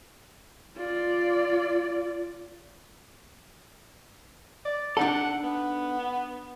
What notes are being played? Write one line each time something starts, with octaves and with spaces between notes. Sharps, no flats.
F4 D5
D5
D4 D#4 A4 F#5
B3